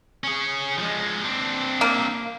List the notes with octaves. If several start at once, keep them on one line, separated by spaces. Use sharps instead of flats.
C#4 G#4
F3 G#3
C4 D4
A#3